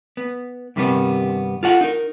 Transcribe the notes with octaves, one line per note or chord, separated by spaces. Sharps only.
B3
G2 C3 D#3 G3 B3
F4 A4 F#5
D#4 A#4